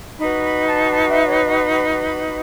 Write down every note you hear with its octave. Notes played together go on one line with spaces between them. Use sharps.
D#4 F#4 B4 B5
B5
A5
A5
E5
C#5
D#5
B5
B5